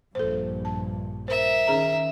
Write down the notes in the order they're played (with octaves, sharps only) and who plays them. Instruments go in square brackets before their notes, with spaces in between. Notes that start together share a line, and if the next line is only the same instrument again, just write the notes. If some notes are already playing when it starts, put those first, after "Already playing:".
[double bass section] A#1 G2 [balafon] A4 C5
[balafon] A5
[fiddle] A#4 E5 [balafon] C5
[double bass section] D#3 [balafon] C#4 G#4 A#5